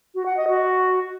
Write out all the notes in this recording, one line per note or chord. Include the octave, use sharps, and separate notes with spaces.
F#4
F#5
D#5
F#4